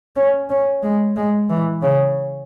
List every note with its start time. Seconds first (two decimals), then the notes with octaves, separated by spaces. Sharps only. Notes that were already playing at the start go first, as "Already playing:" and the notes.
0.16 C#4
0.50 C#4
0.83 G#3
1.16 G#3
1.50 E3
1.82 C#3